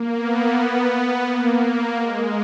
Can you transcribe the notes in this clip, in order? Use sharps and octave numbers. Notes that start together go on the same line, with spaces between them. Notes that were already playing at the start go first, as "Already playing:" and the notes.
Already playing: A#3
B3
A#3
G#3